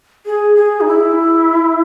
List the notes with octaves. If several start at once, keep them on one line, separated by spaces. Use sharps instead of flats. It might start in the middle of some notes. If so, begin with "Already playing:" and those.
G#4
G#4
D#4
E4